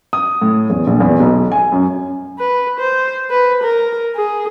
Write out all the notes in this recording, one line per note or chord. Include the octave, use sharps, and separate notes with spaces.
D#6
A2
E2
A#1
E2
B1
G#5
F#2
B4
C5
B4
A#4
G#4